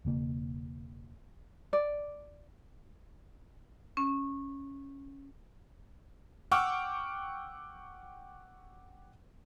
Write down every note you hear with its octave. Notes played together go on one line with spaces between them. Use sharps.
E1 C#3 A#3
D5
C#4
F#5 G5 C#6 D6 E6 F6